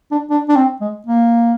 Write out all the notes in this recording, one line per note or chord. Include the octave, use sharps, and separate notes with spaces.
D4
D4
D4
C4
G#3
A#3